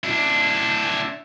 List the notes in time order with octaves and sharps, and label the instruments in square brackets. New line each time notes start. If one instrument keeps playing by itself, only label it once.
[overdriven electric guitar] D4 E4